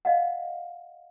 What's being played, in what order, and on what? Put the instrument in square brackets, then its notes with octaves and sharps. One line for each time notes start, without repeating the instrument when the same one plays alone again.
[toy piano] D#5 F5 F#5